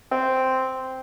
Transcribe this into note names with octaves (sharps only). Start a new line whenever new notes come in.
C4